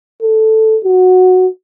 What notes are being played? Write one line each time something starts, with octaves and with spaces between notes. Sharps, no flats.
A4
F#4